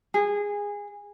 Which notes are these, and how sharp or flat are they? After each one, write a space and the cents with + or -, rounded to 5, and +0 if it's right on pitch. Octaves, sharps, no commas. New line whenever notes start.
G#4 -20